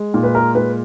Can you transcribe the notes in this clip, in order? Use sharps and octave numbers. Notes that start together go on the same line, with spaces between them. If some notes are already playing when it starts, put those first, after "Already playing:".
Already playing: G#3
A#2
B4
A#4
G#3 B4